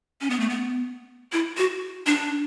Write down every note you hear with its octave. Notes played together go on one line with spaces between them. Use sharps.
C#4
B3
A3
B3
E4
F#4
D4